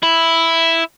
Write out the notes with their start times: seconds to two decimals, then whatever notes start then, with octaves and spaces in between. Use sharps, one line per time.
0.03 E4